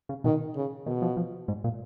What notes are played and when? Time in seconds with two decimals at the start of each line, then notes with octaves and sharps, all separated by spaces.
0.09 C#3
0.24 B2 D#3
0.56 C#3
0.86 B2 D#3
1.02 F3
1.17 F3
1.48 G#2
1.64 A#2